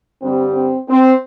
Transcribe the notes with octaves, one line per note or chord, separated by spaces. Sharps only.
G2 D3 G3 C4
C4
C4